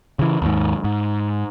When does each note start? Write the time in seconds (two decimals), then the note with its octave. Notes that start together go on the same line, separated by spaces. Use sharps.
0.19 C#3 E3
0.42 D#2 G#2
0.84 G#2